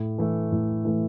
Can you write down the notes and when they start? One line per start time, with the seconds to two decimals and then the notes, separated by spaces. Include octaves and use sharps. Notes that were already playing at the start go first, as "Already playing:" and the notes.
Already playing: A2
0.18 E3 A3
0.52 A2
0.85 E3 A3